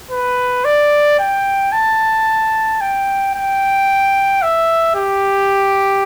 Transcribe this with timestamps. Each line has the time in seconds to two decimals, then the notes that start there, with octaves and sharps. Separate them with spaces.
0.11 B4
0.65 D5
1.19 G5
1.72 A5
2.81 G5
3.35 G5
4.42 E5
4.95 G4